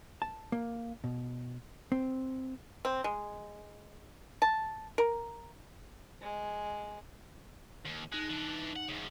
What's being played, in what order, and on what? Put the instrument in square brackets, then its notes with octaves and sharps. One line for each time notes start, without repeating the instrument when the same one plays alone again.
[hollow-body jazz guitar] A5
A#3
B2
C4
[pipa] C4
G#3
A5
A#4
[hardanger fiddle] G#3
[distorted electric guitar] D#2
[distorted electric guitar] G#3 [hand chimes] D#4 F#6
[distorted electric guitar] E3 D4
F#5
F#2 C#3